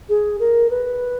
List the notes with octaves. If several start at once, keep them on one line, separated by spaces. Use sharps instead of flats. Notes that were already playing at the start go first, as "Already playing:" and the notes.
G#4
A#4
B4